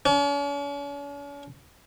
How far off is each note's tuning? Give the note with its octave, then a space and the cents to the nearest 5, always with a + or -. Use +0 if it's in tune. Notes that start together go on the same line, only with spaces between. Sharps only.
C#4 +45